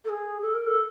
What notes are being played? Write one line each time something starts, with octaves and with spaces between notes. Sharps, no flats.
A4
G#4
A4
A#4
A4